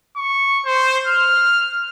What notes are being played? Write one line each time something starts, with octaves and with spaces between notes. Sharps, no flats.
C#6
C5
F6